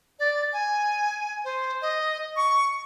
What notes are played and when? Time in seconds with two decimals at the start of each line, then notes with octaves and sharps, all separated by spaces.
0.19 D5
0.53 G#5
1.44 C5
1.82 D#5
2.36 C#6